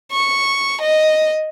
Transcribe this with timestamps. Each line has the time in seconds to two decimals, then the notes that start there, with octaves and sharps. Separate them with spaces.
0.12 C#6
0.82 D#5